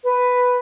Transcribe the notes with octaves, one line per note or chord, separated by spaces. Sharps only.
B4